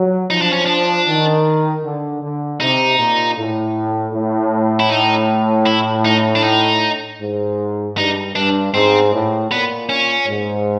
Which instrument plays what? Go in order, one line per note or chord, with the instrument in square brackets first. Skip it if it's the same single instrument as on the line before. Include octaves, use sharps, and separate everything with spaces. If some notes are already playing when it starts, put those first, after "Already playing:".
Already playing: [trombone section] F#3
[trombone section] F3 [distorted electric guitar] D#4
[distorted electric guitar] D4
C#4
D4
[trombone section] D#3
D3
D3
[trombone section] C3 [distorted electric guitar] D#4
[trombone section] A#2
A2
A2
[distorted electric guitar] E4
D#4
E4
D#4
D4
D#4
[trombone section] G#2
[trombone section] G2 [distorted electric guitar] D#4
[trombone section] G2 [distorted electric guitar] D4
[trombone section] G#2 [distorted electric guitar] C4
[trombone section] A2
[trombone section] A#2 [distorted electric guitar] B3
[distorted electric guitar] C#4
[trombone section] G#2